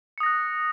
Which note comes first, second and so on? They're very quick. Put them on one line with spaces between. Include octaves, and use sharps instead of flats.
C#7 D#6 A#6 F#6